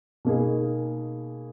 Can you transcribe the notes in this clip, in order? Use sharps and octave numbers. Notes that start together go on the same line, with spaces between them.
B2 A#3 D#4 G#4